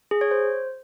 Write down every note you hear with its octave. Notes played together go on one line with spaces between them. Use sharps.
G#4
C#5
C5